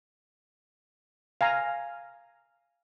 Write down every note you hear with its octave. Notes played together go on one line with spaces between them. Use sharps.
F5 G#5 A#5